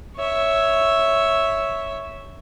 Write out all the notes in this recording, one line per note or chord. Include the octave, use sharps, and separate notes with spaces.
C#5 E5